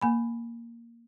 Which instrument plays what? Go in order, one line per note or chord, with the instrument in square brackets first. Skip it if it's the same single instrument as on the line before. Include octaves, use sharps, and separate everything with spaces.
[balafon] A#3 G#5 B5